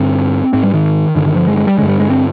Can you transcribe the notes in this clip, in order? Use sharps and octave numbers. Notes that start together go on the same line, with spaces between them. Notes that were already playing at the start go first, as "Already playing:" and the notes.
Already playing: G2 D3 C4
G#2 C4
G3
D#3
G2 D3 D#3
D#3
F3
G#3
G#3
G3
G2 D3 G#3
G3
G#3
C4